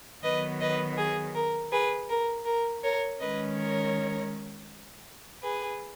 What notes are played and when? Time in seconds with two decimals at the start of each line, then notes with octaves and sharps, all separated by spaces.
0.23 D#3 F#3 B3 B4 D#5
0.61 B4 D#5
0.97 G#4
1.34 A#4
1.71 G#4 B4
2.09 A#4
2.45 A#4
2.83 A#4 C#5
3.19 D#3 G#3 C#4 B4 D#5
3.58 A#4 C#5
5.42 G#4 B4